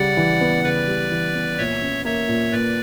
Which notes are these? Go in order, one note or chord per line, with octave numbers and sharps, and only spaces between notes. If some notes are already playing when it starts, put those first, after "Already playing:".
Already playing: C#3 G3 D5 F#5
E3
B3
C#3 B4 D5
G3
E3
B3
A#2 C#5 E5
C#4
A#3 C#5 E5
A#2
A#2 B4 D5